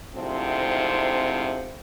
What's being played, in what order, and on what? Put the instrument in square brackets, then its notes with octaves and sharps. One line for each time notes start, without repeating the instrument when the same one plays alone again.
[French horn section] D2 G#2 C3 F3 C4 E4